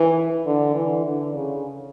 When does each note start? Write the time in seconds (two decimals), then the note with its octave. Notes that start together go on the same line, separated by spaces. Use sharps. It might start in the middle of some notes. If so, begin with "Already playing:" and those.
Already playing: E3
0.45 D3
0.75 E3
1.05 D3
1.34 C#3